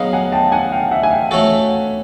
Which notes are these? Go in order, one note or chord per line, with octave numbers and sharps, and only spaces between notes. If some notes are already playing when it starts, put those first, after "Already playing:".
Already playing: F#3 B3 D#4 G#4 D#5 F5 F#5
F#5 G#5
G5 A5
F#5 G#5
F5 G5
E5 F#5
G#5
F5 G5
A3 C#4 F#4 A4